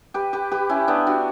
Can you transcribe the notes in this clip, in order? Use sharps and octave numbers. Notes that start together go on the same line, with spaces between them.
G4 B4
G4 B4
G4 B4
C#4 E4
B3 D4
D4 F#4